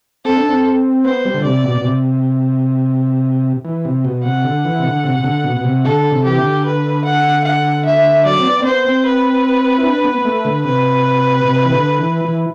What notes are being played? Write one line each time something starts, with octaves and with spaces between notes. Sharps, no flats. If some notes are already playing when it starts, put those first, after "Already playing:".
C4 A4
D4
C4
B3 C5
G3
D3
C3 D5
B2
B2
C3
E3
C3
B2
C3 F#5
D3
E3
C3
D3
C3
C3
D3
B2
B2
C3
D3 A4
C3
E3 G4
D3
B4
F#5
F#5
E5
F#3 D5
C4
B3
C4
B3 C5
C4
B4
E4
D4
B3
B3
A3
D3
C3 B4
C3
E3
D3
E3
E3